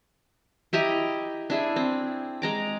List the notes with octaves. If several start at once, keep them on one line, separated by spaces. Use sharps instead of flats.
E4 G4 D#5 A#5
D4 E4 G#4
C4
G#3 A#5 D6